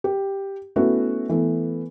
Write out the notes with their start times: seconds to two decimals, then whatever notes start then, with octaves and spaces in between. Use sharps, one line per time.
0.04 G4
0.76 A3 B3 C#4 E4 F#4 B4
1.29 E3 A3 B3